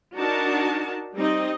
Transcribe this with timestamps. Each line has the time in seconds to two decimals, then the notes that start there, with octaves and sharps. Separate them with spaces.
0.16 D4 D#4 F#4 A#4 A5
1.14 G3 C4 D#4 D#5